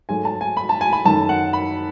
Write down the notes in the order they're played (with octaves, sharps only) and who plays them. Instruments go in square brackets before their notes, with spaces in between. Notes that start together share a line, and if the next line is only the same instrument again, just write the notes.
[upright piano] G#2 F#3 A3 G#5
A5
G#5
B5
A5
G#5
B5
F#2 D#3 A3 A5
F#5
B5